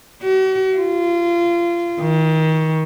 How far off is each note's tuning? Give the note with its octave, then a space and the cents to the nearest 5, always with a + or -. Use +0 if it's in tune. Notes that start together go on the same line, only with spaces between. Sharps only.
F#4 +45
F4 -25
D#3 +30